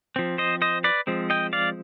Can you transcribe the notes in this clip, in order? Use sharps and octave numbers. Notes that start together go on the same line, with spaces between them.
F3 C4
C5 D#5
C5 D#5
B4 D5
F3 G#3 C4
D#5 G5
D5 F5